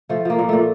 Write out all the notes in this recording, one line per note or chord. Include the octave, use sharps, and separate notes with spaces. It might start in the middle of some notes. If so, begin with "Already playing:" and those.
F3 A3
F3 A#3
A#2
A#2 A3